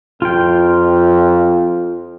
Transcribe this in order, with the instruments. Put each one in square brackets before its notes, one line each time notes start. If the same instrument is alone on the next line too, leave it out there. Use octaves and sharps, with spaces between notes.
[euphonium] F2 [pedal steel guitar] F4 G5